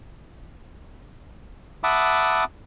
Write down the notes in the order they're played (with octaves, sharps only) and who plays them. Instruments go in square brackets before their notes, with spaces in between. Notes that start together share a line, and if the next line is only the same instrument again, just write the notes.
[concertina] E5 F#5 A5 B5 D6 D#6